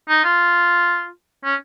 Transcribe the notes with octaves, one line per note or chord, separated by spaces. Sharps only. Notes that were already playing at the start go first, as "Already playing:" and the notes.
D#4
F4
C#4